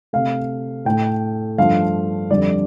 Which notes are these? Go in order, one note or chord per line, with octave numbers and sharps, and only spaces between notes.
C3 A3 F5
A2 A3 G5
G2 F3 A3 F5
F2 D3 G3 D5